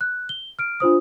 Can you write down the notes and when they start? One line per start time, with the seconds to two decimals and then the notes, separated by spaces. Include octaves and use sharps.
0.01 F#6
0.29 G7
0.59 F6 D7
0.80 D4 F4 C5 D#6